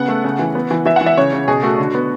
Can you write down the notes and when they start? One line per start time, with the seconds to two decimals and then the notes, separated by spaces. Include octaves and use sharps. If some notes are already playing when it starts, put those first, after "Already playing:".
Already playing: C#3 B3 F#5
0.08 A3
0.24 C#3
0.39 E3
0.55 B3
0.71 E3
0.86 E3 E5
0.96 E3 F#5
1.06 E5
1.17 C#3 C#5
1.33 C#3
1.48 B2 G#4
1.63 A3 F#4
1.78 D3
1.94 B3